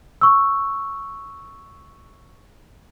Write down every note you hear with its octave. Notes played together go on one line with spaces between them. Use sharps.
C#6 E6